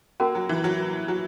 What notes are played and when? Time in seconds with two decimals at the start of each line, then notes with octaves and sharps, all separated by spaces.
0.20 A#3 C#4 F#4 A#4
0.35 F#3
0.49 E3
0.64 F#3
1.08 F#3